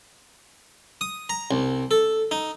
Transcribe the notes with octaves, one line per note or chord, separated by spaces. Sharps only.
D#6
A#5
C2
A4
D#4